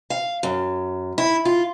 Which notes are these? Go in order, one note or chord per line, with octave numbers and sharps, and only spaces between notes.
F5
F#2
E4
F4